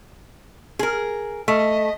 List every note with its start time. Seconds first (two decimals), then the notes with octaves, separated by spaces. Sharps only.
0.79 G#4 A#4
1.48 A3 D#5